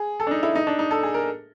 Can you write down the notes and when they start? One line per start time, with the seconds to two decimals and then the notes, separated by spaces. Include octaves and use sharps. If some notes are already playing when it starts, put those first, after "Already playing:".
Already playing: G#4
0.20 A4
0.27 D4
0.31 D#4
0.43 E4
0.55 D#4
0.67 D4
0.79 D#4
0.91 A4
1.03 G#4
1.14 A#4